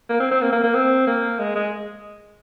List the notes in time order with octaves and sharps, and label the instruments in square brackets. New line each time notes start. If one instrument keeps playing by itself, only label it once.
[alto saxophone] A#3
C4
C4
A#3
A#3
A#3
C4
A#3
G#3
G#3